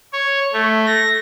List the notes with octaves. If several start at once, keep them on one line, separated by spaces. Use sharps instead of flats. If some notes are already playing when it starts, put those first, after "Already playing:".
C#5
A3
A#6